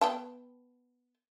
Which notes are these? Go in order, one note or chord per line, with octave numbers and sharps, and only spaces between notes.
B3 G5 A5